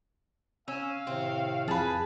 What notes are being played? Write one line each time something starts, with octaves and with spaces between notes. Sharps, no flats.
C#4 F5 G#5 E6
A2 C3 D#3 C4
F2 G#4 B4 A5